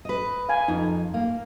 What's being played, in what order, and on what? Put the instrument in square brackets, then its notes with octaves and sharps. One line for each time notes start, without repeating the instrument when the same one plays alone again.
[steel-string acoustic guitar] B4 D#5
[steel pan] F5 G#5
[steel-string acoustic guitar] F2 [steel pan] D#4
[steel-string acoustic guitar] A#3 [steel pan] F5